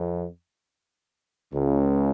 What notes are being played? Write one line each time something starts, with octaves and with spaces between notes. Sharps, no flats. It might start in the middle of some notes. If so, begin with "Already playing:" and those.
Already playing: F2
C#2 C#3